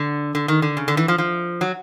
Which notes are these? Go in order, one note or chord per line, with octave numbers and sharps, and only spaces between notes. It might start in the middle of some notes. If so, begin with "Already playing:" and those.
Already playing: D3
D3
D#3
D3
C#3
D3
E3
F3
F3
F#3